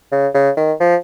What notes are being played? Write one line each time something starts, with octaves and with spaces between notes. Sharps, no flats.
C#3
C#3
D#3
F3